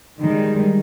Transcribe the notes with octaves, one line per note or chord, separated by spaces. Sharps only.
D#3 G3 G#3